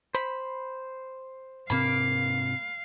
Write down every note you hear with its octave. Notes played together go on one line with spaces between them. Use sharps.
C5 B5
G#2 C3 A#3 C4 F5 B5